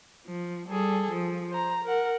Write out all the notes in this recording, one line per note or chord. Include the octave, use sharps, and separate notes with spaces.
F3
G3 G#4 A4
F3
C5 A#5
A#4 F#5